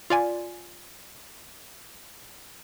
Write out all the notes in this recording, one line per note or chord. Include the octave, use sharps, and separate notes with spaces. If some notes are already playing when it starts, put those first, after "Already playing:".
F4 D5 G#5